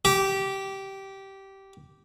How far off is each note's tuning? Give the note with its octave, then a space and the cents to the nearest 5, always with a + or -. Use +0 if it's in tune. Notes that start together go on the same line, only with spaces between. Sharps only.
G4 -15